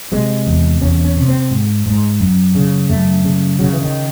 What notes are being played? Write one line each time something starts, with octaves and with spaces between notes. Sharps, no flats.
C3 G#3
E2
E2 C#4
C#4
C3
C4
G#2
G#2
F#2
C#3
F#2 A3
C#3
C#3 F#3
E3
D#3